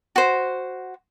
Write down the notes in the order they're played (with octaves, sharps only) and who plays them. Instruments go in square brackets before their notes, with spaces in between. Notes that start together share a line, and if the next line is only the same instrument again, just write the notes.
[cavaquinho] F#4 C5